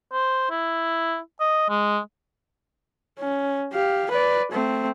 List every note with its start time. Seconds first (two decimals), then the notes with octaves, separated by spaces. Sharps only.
0.12 C5
0.50 E4
1.40 D#5
1.69 G#3
3.19 C#4
3.73 G4 F5
4.11 B4 D5
4.52 A3 C4